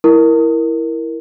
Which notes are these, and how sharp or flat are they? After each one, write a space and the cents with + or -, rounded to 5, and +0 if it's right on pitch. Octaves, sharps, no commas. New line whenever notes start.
E4 +0 A#4 +0